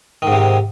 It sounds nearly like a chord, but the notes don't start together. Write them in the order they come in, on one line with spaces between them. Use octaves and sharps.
D#3 G#2 C3